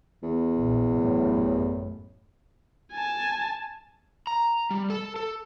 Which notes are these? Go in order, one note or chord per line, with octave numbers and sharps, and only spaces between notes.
E2
A#1
A1 F#2 A2
G#5 A5
A#5
G3
A4
A4